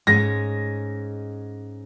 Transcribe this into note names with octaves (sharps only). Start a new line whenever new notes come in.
G#2 G#3 C#4 A#6